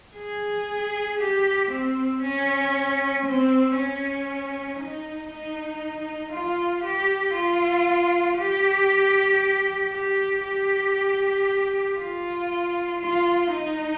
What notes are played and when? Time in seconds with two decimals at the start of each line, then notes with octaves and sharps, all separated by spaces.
0.17 G#4
1.20 G4
1.70 C4
2.22 C#4
3.25 C4
3.75 C#4
4.78 D#4
5.30 D#4
6.33 F4
6.84 G4
7.35 F4
8.38 G4
9.92 G4
10.43 G4
11.97 F4
12.99 F4
13.51 D#4